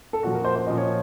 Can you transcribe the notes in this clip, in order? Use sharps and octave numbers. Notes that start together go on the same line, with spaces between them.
A4
A#2 F3 F#4
A#4
C5
C5
A#2 F3 D#5
C#5